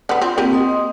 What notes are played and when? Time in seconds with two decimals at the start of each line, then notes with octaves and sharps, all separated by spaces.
0.09 D3 B3
0.22 C4 F4
0.38 A#3 C4 G4 A#4
0.52 D#5 C6 D#6